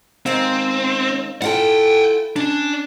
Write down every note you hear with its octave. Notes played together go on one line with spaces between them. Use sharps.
D#3 G#3 C4 F5
E4 F4 A4 F#5 G5
C#4 D4